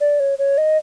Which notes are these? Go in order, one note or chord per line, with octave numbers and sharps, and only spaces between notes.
D5
C#5
C#5
D#5